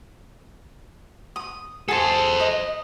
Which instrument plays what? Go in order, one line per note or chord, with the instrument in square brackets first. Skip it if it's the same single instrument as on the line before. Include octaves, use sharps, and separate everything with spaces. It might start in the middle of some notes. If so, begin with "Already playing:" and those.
[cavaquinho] D#6
[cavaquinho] G#4 A5 [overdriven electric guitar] A4 C5
[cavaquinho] D#5